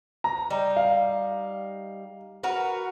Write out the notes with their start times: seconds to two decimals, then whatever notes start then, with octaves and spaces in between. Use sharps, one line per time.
0.24 A#5
0.50 G3 D#4
0.77 F5
2.43 F#4 A#4 B4